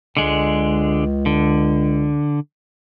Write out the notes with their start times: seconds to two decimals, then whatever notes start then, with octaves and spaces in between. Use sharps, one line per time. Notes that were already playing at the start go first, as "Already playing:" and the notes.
0.17 C#2 D3 G#3
1.26 D3